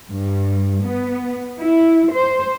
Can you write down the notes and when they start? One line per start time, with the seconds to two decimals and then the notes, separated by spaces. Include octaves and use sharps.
0.11 G2
0.83 B3
1.60 E4
2.12 C5